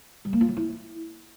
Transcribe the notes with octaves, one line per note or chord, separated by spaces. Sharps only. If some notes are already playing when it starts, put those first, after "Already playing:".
G3
A#3
F4
F#3
E4